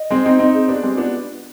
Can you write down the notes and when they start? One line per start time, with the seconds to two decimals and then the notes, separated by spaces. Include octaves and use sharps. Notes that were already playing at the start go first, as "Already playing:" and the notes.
Already playing: D#5
0.10 G#3 C4
0.25 C4 D#4
0.39 C4 D#4
0.54 G#4
0.68 B3 D4 G4
0.83 G#3 C4 G4
0.97 B3 D4 F4